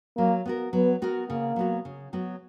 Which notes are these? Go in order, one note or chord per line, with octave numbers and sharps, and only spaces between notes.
F#3 A#3
B3 F#4 A#4
F#3 B3
B3 F#4 A#4
C#3 A#3
F#3 B3 F#4
C#3
F#3 B3 F#4